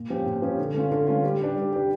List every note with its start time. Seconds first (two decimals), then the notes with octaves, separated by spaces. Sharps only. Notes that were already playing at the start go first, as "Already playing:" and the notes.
Already playing: A#2
0.10 F3 C#4 G4
0.26 A#2
0.42 F3 C#4 G4
0.59 D3
0.74 A3 C#4 F4
0.92 D3
1.07 A3 C#4 F4
1.24 G3
1.40 D4 G4
1.56 G3
1.72 D4 G4